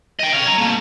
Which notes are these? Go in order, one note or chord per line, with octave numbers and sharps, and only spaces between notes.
D#5 G5
C#5 F5
C#5 A#5
A3 A#3